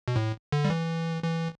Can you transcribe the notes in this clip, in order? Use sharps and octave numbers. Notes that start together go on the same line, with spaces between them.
B2
A2
D3
G3
E3
E3